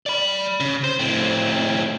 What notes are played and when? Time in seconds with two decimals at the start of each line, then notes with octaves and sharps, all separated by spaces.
0.06 D5 B5
0.60 C#3
0.84 C5
1.00 A2 C4